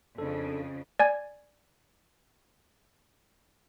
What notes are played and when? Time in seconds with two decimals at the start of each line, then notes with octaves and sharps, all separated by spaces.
0.18 F2 C#3 D4 A4
0.99 D5 G#5 G#6